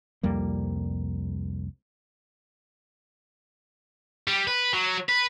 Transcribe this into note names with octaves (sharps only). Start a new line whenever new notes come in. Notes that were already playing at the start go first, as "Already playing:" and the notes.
C2 F2 G3 A#3
G3
B4
F#3
B4